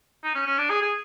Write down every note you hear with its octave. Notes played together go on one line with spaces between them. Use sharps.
D#4
C#4
C#4
D4
G#4
G#4